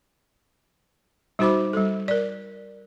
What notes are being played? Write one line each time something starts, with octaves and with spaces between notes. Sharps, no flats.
G3 D#4 F#4 C5 B5 D6
G3 A4
A#4 D5